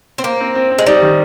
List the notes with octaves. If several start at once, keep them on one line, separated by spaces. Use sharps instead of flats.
C4
A#3 C5
C4
C4
C4
G#3
G3 D#4
D#3